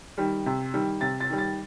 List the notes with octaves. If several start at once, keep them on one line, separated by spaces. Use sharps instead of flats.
D#3 G3
C3
D#3 G3
C3 A6
A6
D#3 G3
A6